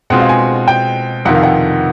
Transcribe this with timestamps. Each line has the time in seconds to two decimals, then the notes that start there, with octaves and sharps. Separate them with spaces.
0.10 B2 G#3 C4 F4 G#4 F#5
0.20 F5
0.29 G#5
0.68 G5
1.25 F2 C3 D#3 F#5
1.35 F5
1.43 F#5